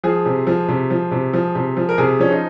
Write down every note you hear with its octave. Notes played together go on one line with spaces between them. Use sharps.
F3 G#4
C3
F3
C3
F3
C3
F3
C3
F3
A#4
C3 G#4
F3 C#4
D#4